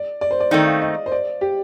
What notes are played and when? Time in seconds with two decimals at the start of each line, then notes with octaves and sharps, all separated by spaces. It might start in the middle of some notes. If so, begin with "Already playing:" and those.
Already playing: D5
0.21 D5
0.31 C5
0.40 D5
0.51 D#3 A3 C4 D#4 D5
0.66 F5
0.82 D#5
1.06 C5
1.12 D5
1.41 G4